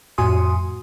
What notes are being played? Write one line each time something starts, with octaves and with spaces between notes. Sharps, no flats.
F2 A2 F#4 G#5 C6 D#6